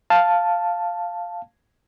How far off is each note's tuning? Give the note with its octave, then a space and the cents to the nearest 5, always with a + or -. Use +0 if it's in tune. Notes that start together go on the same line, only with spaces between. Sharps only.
F5 +0 A5 +0